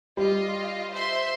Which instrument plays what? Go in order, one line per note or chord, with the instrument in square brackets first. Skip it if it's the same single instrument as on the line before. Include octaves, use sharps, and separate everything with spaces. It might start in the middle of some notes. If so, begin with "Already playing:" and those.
[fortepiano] G3 [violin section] F4 D#5
[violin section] C5 E5 C6